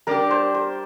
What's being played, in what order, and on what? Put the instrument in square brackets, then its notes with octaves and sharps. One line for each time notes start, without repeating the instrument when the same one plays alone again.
[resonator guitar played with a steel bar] G3 D4 G4 [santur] A#4
[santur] C5
C5